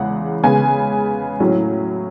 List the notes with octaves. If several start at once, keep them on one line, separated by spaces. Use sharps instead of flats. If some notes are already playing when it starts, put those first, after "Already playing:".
Already playing: E2 C#3 G#3 F#5
C#3 G#3 B3 G#5
A2 F#3 C#4